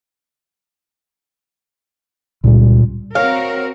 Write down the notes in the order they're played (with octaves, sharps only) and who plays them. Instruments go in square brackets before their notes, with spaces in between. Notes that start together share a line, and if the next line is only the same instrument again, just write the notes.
[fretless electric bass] C#2 G3 [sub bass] A#2
[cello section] C4 F#4 A#4 [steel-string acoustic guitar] C#5 [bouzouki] F5